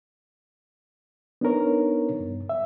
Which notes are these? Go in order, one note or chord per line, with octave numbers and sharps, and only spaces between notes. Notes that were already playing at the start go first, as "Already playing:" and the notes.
B3 D4 D#4 A#4 C#5
G2
E5